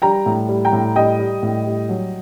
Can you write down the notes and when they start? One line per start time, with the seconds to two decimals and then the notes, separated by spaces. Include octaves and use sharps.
0.02 G3 G5 A#5
0.26 A2
0.49 G3
0.65 G5 A#5
0.73 A2
0.96 G3 D#5 G5
1.19 G3
1.43 A2
1.66 G3
1.89 F#3